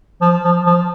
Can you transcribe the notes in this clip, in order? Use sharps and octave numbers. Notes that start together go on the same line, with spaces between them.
F3
F3
F3